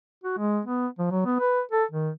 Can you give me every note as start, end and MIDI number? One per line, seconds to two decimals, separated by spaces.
0.24 0.36 66
0.38 0.60 56
0.65 0.87 59
0.99 1.09 53
1.11 1.21 54
1.26 1.36 59
1.40 1.61 71
1.72 1.84 69
1.91 2.10 51